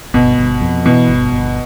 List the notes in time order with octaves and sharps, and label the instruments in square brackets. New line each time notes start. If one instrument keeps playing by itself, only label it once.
[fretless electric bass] G1 [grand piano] B2
[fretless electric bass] G1
F2
[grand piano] B2 [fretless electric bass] E3
[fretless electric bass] G1
G1